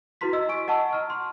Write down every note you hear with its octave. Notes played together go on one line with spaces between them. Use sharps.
E4 F#4 B4 A#5 C6 B6
D#5 E6
G#5 C#6 D7
D#5 F#5 A5 C#6 E6
A#5 F6
C6